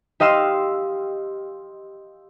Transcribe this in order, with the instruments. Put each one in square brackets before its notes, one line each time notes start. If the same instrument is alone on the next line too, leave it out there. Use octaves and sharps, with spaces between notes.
[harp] G4 D#5 F5 C6 E6